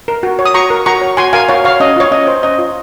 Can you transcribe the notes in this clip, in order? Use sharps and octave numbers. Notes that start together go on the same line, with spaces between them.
A#4
F#4
C#5
D#6
F#4 A#5 C#6
A#4
F#4 A#5 C#6
C#5
F#4 G#5 C6
A#4 F5 G#5
F#4 C#5 F5
C#5 F5
C#4 D#5
F4 C#5
C#4 D#5
C5
C#4 D#5
F4